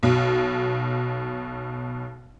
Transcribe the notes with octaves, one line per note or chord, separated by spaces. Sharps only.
B1 B2